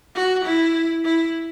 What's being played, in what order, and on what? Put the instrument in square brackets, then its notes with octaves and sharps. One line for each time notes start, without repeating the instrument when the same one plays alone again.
[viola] F#4
E4
E4